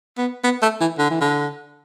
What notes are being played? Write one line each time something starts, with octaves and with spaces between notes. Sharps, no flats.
B3
B3
A3
E3
D3
E3
D3